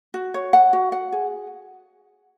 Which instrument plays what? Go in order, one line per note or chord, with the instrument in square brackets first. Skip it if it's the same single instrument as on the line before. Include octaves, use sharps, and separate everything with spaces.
[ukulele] F#4
C#5
F#5
F#4
F#5
G#4